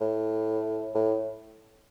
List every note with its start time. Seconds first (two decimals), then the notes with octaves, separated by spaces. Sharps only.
0.01 A2
0.95 A2